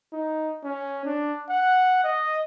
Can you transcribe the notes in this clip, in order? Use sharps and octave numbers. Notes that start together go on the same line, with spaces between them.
D#4
C#4
D4
F#5
D#5